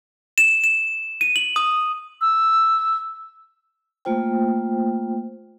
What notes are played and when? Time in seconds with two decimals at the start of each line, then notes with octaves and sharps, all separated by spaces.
0.38 E7
0.64 E7
1.21 D#7
1.36 F#7
1.56 D#6
2.21 E6
4.05 A3 A#3 F4 C5 G5